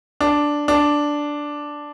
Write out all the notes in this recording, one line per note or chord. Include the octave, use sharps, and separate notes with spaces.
D4
D4